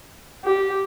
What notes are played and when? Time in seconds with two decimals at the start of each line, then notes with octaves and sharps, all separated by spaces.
0.45 G4